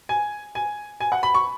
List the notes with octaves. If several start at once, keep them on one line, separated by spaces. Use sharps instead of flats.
G#5
G#5
G#5
F#5
B5
C#6